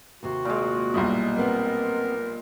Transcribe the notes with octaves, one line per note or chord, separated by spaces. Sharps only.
D#2 C3 F#4 C5
A#2 G#3
B1 G2 A#2 E4 D#5
B3 C4 A#4